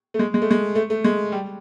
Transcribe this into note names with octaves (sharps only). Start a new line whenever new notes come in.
A3
G#3
G#3
A3
G#3
A3
A3
G#3
G3